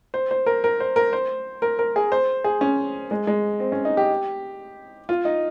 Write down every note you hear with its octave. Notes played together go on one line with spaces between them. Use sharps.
C5
C5
A#4
A#4
C5
A#4
C5
A#4
A#4
G#4
C5
G#4
C#4
G#3
G#3
C4
C#4
D#4
G4
F4
D#4